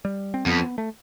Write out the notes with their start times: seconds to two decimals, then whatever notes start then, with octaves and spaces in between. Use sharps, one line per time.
0.05 G3
0.34 C4
0.46 F2 B3
0.78 A3